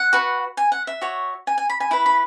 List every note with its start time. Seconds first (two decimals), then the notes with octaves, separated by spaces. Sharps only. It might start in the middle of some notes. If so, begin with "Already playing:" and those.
Already playing: F#5
0.13 F#4 B4
0.57 G#5
0.72 F#5
0.87 E5
1.02 F#4 C#5
1.47 G#5
1.58 G#5
1.70 B5
1.80 G#5
1.91 E4 B4 B5
2.06 B5